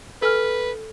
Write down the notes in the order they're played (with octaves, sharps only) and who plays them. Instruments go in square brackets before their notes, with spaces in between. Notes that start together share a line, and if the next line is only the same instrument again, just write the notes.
[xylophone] A4 G#5 F6 [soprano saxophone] B4